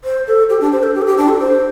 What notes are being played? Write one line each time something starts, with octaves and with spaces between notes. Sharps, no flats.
C5
A4
G4
D4
C5
A4
G4
A4
G4
D4
A4
C5